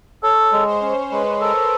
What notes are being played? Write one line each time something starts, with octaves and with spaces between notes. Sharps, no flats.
A4 C#5
G#3
C5
C#4
G#3 B4
A4 A#4